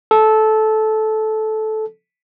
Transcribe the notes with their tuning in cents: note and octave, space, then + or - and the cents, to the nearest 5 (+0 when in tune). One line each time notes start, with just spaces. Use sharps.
A4 -15